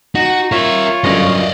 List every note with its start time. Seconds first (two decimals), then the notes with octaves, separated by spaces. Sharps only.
0.15 D#4 F#4
0.52 F4 A#4 C#5 E5
1.04 G1 F#2 D5 D#5 A#6